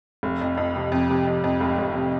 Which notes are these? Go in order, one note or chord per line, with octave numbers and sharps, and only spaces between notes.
F1
F2
F2
C3
F2
C3
F2
F2
F1
F1
C3